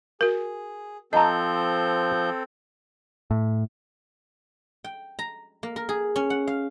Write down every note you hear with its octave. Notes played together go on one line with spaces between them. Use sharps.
F#4 G#4 A#4
F3 C4 A4 D#5 A5 A#5 G6
A2
G5
A#5
A#3
A#4
G#4
C#4
F#5
F5